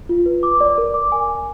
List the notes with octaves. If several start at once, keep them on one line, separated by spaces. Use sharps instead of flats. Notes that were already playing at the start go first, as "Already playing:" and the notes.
F4
B4
D6
D5
A#4
D6
G#5
G#5